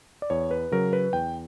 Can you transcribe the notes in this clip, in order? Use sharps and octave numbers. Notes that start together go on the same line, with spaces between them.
D5
E2 C#5
B4
C#3 F#3 A#4
B4
E2 G5